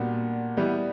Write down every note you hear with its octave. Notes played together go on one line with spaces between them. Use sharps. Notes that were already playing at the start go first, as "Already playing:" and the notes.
Already playing: A#2 G3 B3 D4 F#4
E3 G3 B3